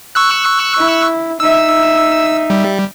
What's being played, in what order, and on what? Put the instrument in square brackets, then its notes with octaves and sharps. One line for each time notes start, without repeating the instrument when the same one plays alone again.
[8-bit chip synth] C#6 E6 F#6
[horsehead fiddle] E4
[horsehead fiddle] D#4 E5 [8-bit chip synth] E6
[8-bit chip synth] G3